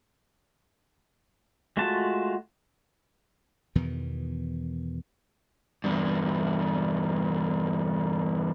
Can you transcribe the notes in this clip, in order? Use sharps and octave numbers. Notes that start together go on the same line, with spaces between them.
G#3 A3 F4 F#4 A5
E2 B2 D#3 E3
E2 G2